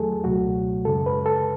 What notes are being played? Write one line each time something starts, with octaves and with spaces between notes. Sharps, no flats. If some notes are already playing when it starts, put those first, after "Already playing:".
Already playing: E2 D#3 F#3 A3 G#4 A4
C#2 B2 F#3 A3 F#4
F#2 C#3 G#3 A4
B4
A4